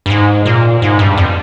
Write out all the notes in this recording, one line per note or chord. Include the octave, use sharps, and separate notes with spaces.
G2
G#2
A#2
G#2
G2
F2